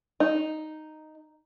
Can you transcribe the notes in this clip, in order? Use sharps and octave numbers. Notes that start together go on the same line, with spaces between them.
D#4